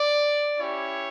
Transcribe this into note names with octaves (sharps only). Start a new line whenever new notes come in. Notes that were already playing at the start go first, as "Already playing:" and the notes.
Already playing: D5
C#4 E4 G4 C#5